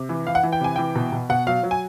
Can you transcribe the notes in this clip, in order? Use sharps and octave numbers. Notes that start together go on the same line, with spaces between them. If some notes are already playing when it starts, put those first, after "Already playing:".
Already playing: C3
E3
E3 F5
F#5
E3
G5
C3 G#5
E3 G5
B2
B2
B2 F#5
F#3 F5
F#3
G#5